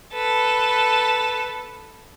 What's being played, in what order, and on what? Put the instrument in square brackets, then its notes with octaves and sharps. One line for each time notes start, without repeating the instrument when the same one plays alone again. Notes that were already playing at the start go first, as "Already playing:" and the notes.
[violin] A4 B4